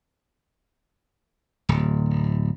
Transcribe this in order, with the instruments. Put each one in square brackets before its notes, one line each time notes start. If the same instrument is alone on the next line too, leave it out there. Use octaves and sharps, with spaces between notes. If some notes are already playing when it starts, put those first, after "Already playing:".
[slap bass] D1